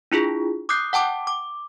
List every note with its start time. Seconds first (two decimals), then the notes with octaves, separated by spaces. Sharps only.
0.12 D4 E4 F4 G#4
0.69 D6 D#6 F#6 G6 C7
0.93 F#5 G5 A5 D6
1.27 D6